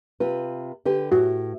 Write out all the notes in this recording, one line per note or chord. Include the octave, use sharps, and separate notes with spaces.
C3 F4 B4
D3 G4 B4
A2 F#4